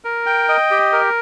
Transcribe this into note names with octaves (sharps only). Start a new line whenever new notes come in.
A#4
G5
D#5
G4
A#4